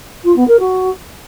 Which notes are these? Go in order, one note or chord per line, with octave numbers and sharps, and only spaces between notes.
F4
B3
A#4
F#4